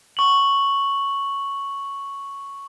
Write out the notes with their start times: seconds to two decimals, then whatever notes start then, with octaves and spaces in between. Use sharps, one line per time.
0.17 C#6 F#7